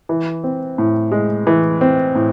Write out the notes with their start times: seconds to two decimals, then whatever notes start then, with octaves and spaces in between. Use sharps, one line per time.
0.09 E3
0.44 C4
0.78 A2
1.12 G#3
1.47 E3
1.81 C4
2.15 A2